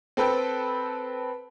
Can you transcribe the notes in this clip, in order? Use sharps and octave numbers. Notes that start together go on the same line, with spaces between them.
C4 A4 B4 G5